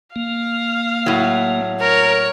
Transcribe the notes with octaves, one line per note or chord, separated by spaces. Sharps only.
A#3 F5
A2 F#3
A#4 C#5